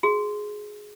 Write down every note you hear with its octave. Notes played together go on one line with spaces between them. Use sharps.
F#4 G#4